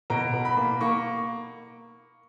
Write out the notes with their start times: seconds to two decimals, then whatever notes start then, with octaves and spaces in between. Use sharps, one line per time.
0.10 B2 A#5
0.34 B2
0.45 B5
0.57 A#3
0.81 A#3 C#6